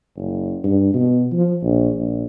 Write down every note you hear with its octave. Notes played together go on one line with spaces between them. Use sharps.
F#1
G2
B2
F3
A#1
A#1